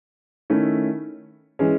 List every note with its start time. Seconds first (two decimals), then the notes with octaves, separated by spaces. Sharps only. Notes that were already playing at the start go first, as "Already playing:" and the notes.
0.50 D#3 A3 C#4 E4
1.59 E3 G#3 C#4